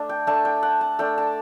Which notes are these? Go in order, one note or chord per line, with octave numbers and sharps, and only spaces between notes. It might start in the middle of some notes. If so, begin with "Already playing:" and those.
Already playing: A3 D4
G5
A3 D4 A5
G5
F#5
A5
A3 D4 G5
A5